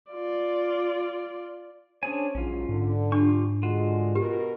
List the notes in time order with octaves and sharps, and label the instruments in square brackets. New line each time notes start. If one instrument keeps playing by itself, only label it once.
[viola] F4 D5
[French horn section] C#4 C5 C#5 [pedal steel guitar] D4 G#4 G#5
[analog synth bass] A#1 [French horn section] G#2 F#3 [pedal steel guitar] C#4 F4
[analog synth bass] G#2 [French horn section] D3
[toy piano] D4 [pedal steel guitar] F4 G4 C#6
[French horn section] D3 G#3 [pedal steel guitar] F4 F#4
[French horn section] B2 A#4 [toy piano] G4